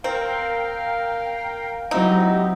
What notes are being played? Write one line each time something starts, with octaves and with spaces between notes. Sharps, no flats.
C4 A#4 F5 G5
F#3 C4 D#4 E4 G4 E5